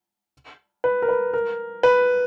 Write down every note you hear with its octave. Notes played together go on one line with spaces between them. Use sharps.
B4
A#4
B4
A#4
B4